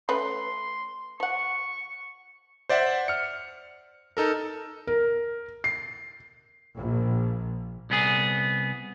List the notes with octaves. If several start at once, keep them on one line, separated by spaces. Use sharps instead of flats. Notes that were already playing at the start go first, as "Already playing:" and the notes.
A3 C#4 B4 C6
F3 F#5 C#6
C5 D5 E5 F#5
F6 C#7
D#4 A4 A#4
A#4
C7
A#1
C2 B3 G#4